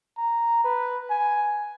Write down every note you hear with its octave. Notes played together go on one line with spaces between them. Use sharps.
A#5
B4
G#5